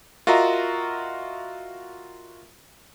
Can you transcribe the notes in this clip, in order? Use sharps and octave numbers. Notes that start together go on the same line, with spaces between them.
F4 F#4 A#4 D#5 E5 A#5